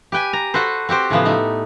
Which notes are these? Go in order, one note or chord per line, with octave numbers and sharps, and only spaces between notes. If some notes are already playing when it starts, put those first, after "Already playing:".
G4 B4 G5 G#5
A#5
F#4 A4 B4 C5
C4 F#4 G4 C5
A2 C#3 F3 B3
A3 D#4